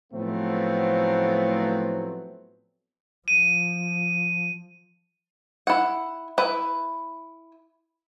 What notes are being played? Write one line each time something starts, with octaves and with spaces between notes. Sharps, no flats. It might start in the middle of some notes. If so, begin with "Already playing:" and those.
A2 F3 F#3 A3 B3 C4
F3 D#7
E4 F#5
E4 B4